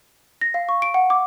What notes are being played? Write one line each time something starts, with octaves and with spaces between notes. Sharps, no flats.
A#6
F5
C#6
D7
F#5
D6